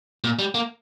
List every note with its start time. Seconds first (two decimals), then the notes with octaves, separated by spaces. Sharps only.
0.24 A#2
0.39 G3
0.55 A#3